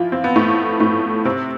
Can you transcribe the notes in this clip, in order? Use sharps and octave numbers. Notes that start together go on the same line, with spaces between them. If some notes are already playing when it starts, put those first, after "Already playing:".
Already playing: E3 F3 E4 F4
C4
B3
A2 A3
A2 A3
C3 C4